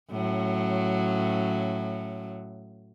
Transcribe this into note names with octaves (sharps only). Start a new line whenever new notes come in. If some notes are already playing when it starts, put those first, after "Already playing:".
A2 F#3 C#4